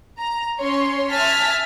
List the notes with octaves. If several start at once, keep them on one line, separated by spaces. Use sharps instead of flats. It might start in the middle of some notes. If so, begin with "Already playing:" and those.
A#5
C#4 C#5 C6
E5 G#5 A5 F6 B6